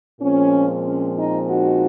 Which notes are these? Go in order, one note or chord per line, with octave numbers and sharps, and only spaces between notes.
A#2 F3 G#3 C4 C#4
C#4
D#4
D#4 F#4